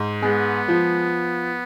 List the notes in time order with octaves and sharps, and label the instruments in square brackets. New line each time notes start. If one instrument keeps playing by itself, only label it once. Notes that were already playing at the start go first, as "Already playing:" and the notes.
Already playing: [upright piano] G#2
[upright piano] G#3 [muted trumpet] B3
[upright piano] F3